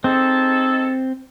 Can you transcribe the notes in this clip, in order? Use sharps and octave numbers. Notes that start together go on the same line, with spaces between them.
C4 D#4 G#4 A4